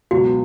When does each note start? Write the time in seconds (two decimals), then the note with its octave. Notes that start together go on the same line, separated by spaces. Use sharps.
0.11 C#2 B2 F#3 F#4